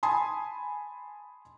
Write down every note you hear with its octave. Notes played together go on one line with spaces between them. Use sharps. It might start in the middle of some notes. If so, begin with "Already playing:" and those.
G#5 A5 B5 C6 D#6